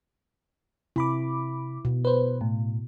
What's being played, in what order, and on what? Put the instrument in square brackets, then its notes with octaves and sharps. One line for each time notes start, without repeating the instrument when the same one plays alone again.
[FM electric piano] C3 B5 D6 [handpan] E4
[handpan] B2
[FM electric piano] B4 C5
A2